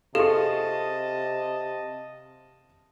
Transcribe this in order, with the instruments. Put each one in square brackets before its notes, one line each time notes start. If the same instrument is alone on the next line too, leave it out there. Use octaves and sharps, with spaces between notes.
[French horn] C3 [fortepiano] F4 G#4 C#6 [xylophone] A4 [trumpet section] D#5 A5